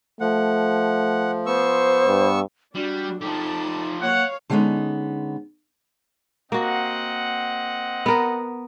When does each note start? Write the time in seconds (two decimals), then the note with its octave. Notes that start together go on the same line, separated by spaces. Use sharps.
0.20 F3 A3 F#5
1.46 B3 C5 C#6 E6
2.07 G2
2.75 G3 D4 F#4
3.21 F3 D#4 G4 A4 A5
4.02 A#3 C#5 F5 F#5
4.50 D3 G3 G#3 B3 C#4 D#4
6.52 A#3 C4 F#4 D#5 F#5
8.06 B3 A#4